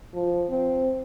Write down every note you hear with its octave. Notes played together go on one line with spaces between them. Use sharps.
F3
C4